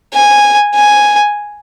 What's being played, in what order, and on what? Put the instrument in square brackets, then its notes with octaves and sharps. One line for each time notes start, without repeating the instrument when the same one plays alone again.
[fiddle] G#5
G#5